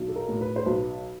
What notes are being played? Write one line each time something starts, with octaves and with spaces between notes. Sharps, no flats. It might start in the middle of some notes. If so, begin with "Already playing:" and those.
Already playing: B1
A4
A#4
A2
B4
C5
B1 B4